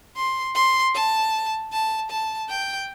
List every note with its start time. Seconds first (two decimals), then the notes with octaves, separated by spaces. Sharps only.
0.16 C6
0.55 C6
0.95 A5
1.72 A5
2.10 A5
2.49 G5